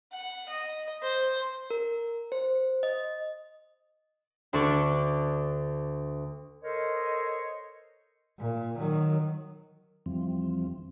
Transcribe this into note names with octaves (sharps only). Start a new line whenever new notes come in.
F#5
D#5
C5
A#4
C5
D#5
D2 D4 A4 C#6 D6
A4 A#4 C5 C#5 D#5
A#2
D#3 F#3
F2 E3 F3 G3 C4